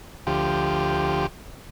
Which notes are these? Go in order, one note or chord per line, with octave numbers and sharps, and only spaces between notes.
D2 F3 G4